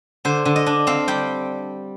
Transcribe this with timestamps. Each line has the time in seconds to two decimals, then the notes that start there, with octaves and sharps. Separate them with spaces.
0.25 D3 C5
0.45 D3
0.56 D#5
0.66 D4
0.87 C4 F5
1.08 G3 G5